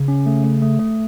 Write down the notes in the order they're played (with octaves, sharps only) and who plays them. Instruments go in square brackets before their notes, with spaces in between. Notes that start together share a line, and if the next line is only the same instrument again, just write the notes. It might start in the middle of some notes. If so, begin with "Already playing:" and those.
Already playing: [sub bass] C#3
[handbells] C#4
A3
A3
A3
A3